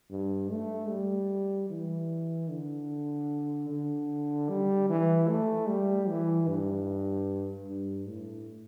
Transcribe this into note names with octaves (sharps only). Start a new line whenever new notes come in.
G2
A3
G3
E3
D3
D3
G3
E3
A3
G3
E3
G2
G2
A2